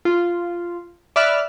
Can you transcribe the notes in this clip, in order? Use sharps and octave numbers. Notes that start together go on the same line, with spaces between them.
F4
D5 E5 B5 F6 F#6